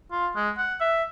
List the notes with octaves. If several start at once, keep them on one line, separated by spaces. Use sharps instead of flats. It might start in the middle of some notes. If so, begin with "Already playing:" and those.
F4
G#3
F#5
E5